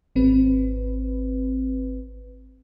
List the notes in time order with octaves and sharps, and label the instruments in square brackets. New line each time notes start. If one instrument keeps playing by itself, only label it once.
[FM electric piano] G#1 C4 B4